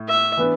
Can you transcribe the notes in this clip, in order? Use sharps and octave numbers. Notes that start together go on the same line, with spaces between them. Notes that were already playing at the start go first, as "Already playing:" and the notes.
Already playing: A2
E5
E3 B3 D4 B4